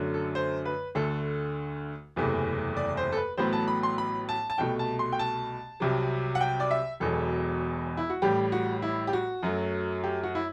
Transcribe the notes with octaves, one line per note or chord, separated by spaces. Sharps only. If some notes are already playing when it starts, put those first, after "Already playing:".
Already playing: F#2 D3 F#3 A3
A4
C5
B4
D2 D3 A3 A4
F#1 E2 C3 E3 A3
D5
C5
A4
B4
A1 A2 F#3 B3 C5
A5
B5
C6
B5
A5
A5
C2 B2 A3 G5
A5
C6
G5
A5
C2 C3 F#3
F#5
G5
D5
E5
E1 E2 B2 F#3 A4
E4
F#4
A1 A2 G3 G4
F#4
E4
G4
F#4
F#2 F#3 A3
G4
F#4
E4